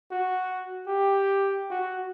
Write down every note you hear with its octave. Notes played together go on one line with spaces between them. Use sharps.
F#4
G4
F#4